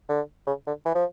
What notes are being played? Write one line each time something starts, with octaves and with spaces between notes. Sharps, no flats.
D3
C#3
D3
E3
F3